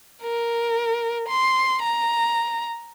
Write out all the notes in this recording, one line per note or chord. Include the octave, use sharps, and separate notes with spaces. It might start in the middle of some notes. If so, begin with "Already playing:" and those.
A#4
C6
A#5